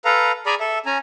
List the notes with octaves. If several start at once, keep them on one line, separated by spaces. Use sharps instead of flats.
A4 B4 F5 A#5
G#4 D5 G#5 A#5 B5
A4 E5
C#4 G#5 A#5